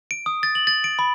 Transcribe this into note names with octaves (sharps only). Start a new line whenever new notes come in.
D7
D#6
A6
F#7
A6
D7
B5